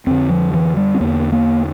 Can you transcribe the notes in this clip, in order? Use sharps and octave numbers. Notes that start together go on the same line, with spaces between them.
F2 D3 C4
F3
E3
G3
C4
E2 D3 A#3
A#3